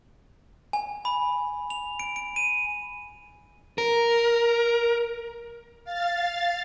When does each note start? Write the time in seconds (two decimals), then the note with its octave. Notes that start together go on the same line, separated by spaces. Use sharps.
0.73 G#5
1.05 B5
1.70 F7
2.00 D7
2.16 D7
2.36 D#7
3.78 A#4
5.84 F5 A6